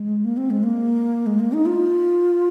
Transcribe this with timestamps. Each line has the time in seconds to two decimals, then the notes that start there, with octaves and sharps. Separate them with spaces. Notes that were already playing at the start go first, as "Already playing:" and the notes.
Already playing: G#3
0.24 A#3
0.37 C4
0.50 G#3
0.63 A#3
1.26 G#3
1.39 A#3
1.53 D#4
1.66 F4